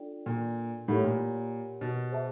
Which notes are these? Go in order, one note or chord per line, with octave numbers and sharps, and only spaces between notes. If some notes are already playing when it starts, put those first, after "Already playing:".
Already playing: D4 F4 A4 D5 G5
A#2
A2 G4 A#4 C#5 F#5 B5
A#2
B2
G#4 C5 E5 A5